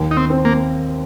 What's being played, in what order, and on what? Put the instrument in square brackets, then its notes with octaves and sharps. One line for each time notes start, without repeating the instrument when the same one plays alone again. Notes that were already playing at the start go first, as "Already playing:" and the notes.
Already playing: [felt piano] D#2
[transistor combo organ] D#4
C4
[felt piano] C4
[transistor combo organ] A#3